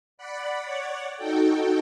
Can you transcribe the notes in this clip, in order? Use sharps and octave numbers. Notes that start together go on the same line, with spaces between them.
D5 F#5 B5
C#5 D5 F#5
D#4 F#4 A4 G5